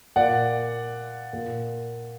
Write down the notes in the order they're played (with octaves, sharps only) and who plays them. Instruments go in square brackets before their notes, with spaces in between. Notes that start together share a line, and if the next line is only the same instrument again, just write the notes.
[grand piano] A#2 D5 F#5
A#2